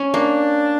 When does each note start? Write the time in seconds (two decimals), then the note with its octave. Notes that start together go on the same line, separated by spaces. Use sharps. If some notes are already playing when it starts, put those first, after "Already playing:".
Already playing: C#4
0.14 A#3 D4